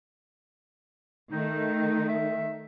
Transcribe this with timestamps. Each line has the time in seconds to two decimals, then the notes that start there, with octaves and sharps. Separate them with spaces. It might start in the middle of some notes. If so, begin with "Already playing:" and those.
1.31 D#3 A3 D#4
2.09 E5